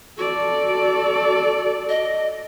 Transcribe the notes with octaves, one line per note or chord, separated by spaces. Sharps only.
F#4 A4 D5
D#5